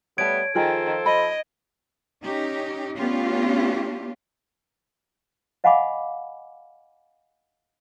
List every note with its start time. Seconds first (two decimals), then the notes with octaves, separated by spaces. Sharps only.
0.18 G3 A3 B3 C#5 A5 G#6 D7
0.55 D#3 F3 F4 G#4 A4 C5 G5
1.06 D#5 B5
2.24 C#4 D#4 G4
2.98 A3 B3 C#4 D4 F4 G4
5.64 D#5 F5 F#5 G#5 B5 D6